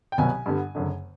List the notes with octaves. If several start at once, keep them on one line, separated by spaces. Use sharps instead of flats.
G5
C2 B2 F#3 B3 G#5
G2 D3 G3 B3
F#1 F#2 D3